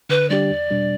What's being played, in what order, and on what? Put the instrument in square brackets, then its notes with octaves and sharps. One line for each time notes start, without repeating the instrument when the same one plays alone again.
[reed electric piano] D3 [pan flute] B4
[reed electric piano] G3 D4 G4 [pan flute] D5
[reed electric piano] E2
B2 G3 D4